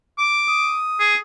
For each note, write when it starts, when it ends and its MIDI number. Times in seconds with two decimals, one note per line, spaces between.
0.19 0.79 86
0.48 1.14 87
1.00 1.16 68